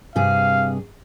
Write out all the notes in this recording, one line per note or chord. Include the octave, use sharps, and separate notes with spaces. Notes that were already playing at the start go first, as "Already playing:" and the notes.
G2 C3 G#4 F5